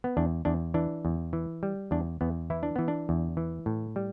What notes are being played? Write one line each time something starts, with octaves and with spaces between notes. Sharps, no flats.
B3
E2 D4
E2 D4
E3 D4
E2
E3
G3
E2 D4
E2 B3
E3 E4
D4
E3 B3
D4
E2
E3
A2
G3